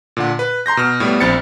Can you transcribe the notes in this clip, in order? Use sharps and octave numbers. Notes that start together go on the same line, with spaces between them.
A#2 D3 F#5
B4
A#5 C6 G6 A#6
B2 F6
A2 G3 B3
A#1 C4 B5 A6 C#7